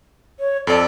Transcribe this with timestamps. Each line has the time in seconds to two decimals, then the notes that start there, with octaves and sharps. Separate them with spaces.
0.39 C#5
0.67 F2 A4 D5